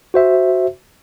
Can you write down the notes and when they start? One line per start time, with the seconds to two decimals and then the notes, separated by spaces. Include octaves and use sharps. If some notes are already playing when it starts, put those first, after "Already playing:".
0.14 F#4 C5 E5